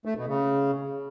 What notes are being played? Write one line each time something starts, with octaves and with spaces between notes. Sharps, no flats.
A3
B2
C#3